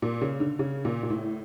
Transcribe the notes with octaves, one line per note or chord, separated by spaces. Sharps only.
A#2
C#3
D3
C#3
A#2
A#2
A2